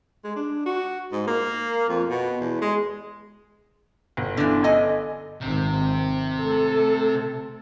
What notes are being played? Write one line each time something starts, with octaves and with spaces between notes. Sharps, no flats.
G#3
D4
F#4
G#2
A#3
F2
B2
E2
G#3
G1
D3 E3
A4 D#5 G#5
G#1 C3 D#3
A3 A4